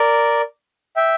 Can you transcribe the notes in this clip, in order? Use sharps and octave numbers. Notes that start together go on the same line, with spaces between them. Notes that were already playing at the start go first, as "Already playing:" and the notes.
Already playing: A#4 D5
E5 G5